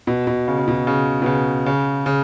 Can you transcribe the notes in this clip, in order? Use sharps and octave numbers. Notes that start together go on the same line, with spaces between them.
B2
B2
C#3
C#3
B2
C#3
B2
C#3
C#3
C#3